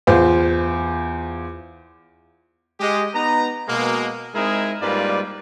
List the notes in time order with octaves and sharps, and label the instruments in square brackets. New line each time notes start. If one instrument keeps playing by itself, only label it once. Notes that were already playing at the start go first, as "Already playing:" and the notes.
[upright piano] E2 F4 C5
[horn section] G#3 G4 D#5
B3 D#4 B4 A#5
B2 G#3 A#3
G#3 C4 D#4 E4 G#4 A#4
G#2 G3 A#3 F4 B4 D5